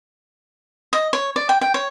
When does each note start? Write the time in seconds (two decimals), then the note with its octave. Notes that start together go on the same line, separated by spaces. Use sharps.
0.93 D#5
1.13 C#5
1.36 D5
1.49 G5
1.61 G5
1.74 C#5